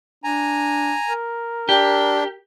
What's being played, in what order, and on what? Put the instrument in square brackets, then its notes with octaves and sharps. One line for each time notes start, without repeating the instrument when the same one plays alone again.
[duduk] D4 [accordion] G#5 A#5
[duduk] A#4
[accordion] D4 [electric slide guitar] G4